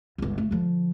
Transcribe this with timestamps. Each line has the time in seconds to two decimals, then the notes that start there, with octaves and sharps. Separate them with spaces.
0.18 G1 C#2
0.38 G#3 A3
0.51 D3 F3